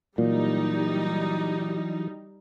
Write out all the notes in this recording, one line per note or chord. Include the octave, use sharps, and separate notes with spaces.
A#2 E3 F#3 G3 D#4